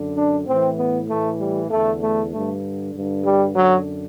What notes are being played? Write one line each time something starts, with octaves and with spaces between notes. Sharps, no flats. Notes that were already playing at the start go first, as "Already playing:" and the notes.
Already playing: F#2 D3
D4
A2 E3 C4
B3
A2 E3 A3
G3
E2 D3 A3
A3
G2 D3 A3
G2 D3
G3
F#2 D3 F#3